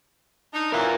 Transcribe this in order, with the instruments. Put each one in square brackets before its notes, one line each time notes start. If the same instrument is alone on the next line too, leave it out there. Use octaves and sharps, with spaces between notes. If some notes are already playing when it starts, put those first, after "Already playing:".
[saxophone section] D4 D#4
[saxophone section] F#2 E3 [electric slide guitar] F4 A#4